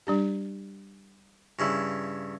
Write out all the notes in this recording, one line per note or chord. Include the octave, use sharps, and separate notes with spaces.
G3 D4 G4
G2 C#3 E4